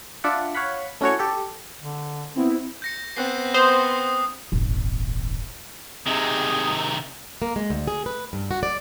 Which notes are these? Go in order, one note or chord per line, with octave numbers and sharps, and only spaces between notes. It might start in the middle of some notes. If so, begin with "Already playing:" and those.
D4 F4 D5 E5 F#5
C#5 F5 F#5 B5
A3 C#4 E4 F#4 A4 C#5
G4 A4
D3
B3 C4 E4
G6 A#6 C#7
B3 C4 F#6 C7
C5 D#6
D#1 G#1
C3 D#3 G#4
A#3
G#3
D2
G#4
B4
G2
F#4
D5